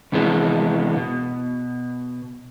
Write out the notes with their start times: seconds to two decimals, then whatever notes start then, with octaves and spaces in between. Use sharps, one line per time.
0.12 F2 C3 E3 G#3 B3
0.96 B2